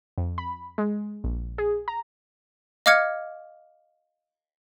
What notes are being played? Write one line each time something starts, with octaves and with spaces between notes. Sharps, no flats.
F2
B5
G#3
A#1
G#4
A#5
D#5 F5 D6 F6 G#6 C#7